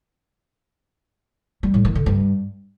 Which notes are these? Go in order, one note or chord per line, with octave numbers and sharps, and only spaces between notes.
G3
A2
D#3
D3
G2